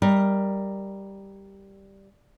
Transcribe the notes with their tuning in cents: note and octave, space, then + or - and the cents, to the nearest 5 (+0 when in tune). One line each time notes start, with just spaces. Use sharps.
G3 +0 A#4 +0 D#5 +30